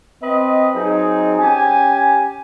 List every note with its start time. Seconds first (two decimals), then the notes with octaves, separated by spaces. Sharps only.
0.22 C4 B4 D#5
0.75 F#3 C4 D#4 G#4
1.39 C#4 G4 G#5